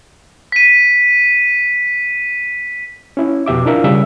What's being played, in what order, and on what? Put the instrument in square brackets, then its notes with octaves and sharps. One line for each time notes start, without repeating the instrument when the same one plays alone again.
[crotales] B6 D#7
[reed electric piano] C#4 E4
F2 B2 G4 E5 D6
D4 E4 F4 A#4 E5 F5
C#3 G3 E5